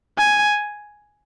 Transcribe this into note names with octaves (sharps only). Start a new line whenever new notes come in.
G#5